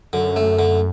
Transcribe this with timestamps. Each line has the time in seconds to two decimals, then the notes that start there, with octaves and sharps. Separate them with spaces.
0.13 F#2 D3
0.36 A3
0.59 D3